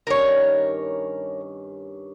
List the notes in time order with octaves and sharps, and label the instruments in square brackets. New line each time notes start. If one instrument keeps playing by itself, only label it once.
[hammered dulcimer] G2 D#3 C#4 [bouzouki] A#4 C#5